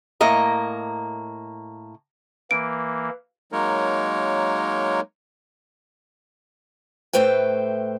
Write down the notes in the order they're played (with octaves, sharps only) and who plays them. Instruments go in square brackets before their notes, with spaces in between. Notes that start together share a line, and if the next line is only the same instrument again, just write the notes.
[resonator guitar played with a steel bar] A2 A#3 D#5 A#5
[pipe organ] E3 A#3 [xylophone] D7
[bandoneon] F#3 G#3 A#3 D#4 A#4 C#5
[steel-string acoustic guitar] A2 A3 B4 C5 G5